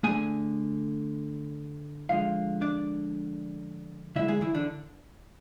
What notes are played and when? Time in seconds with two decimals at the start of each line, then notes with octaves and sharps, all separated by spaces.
0.03 D3 A3 G#4 G#5
2.09 D3 F3 G#3 F4 F5
2.61 D4 D5
4.16 D3 G#3 E4 E5
4.28 G#3 G#4
4.41 E3 E4
4.55 D3 D4